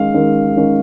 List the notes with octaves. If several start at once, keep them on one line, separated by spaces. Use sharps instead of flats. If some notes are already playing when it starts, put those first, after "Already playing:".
Already playing: D#3 G#3 C#4 F5
D#3 G#3 C#4
D#3 G#3 C#4